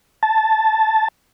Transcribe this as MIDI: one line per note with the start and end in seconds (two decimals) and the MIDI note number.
0.23 1.08 81